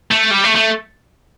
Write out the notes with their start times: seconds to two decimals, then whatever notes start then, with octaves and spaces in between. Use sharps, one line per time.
0.11 A3
0.31 G3
0.43 A3
0.55 A3